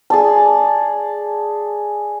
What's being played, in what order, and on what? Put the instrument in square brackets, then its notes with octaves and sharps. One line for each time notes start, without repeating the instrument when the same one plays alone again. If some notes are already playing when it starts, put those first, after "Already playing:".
[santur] G#4 D5 A5